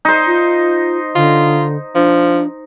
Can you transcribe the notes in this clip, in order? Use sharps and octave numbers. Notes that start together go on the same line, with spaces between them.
D#4 C5
F4
D3 F4
F3 D4